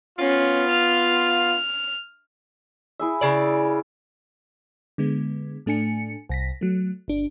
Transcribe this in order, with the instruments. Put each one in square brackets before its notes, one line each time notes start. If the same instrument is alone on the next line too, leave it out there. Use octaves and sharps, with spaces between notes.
[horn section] B3 F4 [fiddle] C#4
[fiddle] F6
[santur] E4 G#4 E5
[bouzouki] C#3 D5
[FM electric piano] D3 G#3 B3
A2 A3 D4 G#5 C#7
C2 A#6 B6
F#3 A3
G1 D4